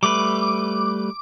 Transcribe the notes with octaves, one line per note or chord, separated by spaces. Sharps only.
G3 A3 B4 D6